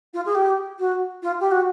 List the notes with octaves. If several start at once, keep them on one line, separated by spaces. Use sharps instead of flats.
F4
G#4
G4
F#4
F4
G4
F#4